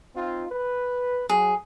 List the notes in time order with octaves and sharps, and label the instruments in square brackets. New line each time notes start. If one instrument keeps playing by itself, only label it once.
[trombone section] C4 D#4 F4
B4
[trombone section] F#3 [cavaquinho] G#4